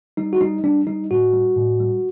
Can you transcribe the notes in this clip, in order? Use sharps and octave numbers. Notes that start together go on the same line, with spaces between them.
G3 D#4
F#4
G3 D#4
G3 D4
G3 D#4
A2 F#4
G3
A2
G3